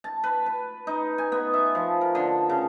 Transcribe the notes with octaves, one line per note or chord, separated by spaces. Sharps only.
A5
B4
B4
D#4
G#5
B3
E5
F3
A#4
D3
C#3